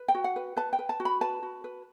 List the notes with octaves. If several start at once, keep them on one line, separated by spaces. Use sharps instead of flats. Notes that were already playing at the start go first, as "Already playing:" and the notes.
Already playing: B4
G5
F#4
F#5
B4
B4 A5
G5
B4
A5
F#4
B5
B4 A5
F#4
B4